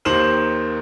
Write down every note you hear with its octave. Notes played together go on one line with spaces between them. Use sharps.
D#2 D#3 A#3 C5 E7 F#7